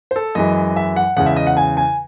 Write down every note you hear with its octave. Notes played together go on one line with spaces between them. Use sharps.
C5
A4
F#2 E3 G#3 D#5
E5
F#5
E2 C#3 G#3 F#5
E5
D#5
F#5
G#5
G#5